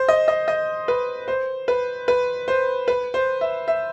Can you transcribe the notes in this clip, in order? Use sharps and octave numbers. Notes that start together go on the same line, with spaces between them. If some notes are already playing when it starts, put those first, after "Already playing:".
Already playing: C5
D#5
D#5
D#5
B4
C5
B4
B4
C5
B4
C5
E5
E5